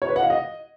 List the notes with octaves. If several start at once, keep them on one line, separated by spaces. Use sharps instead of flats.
C#5
B4
F#5
F5
D#5